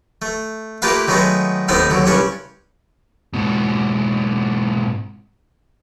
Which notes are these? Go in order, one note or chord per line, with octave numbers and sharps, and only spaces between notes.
A3
A3 A#3 F4 G4 B4 F5
D#3 F#3 G#3 A3 B3
D#2 A2 B3 C4 D#4
D#2 D3 F#3
C2 G2 C#4 D4 C#5
G#2 B2